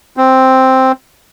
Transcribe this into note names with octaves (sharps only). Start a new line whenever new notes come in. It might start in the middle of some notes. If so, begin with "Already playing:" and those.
C4